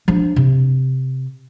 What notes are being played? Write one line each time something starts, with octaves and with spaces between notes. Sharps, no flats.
F3 D4
C3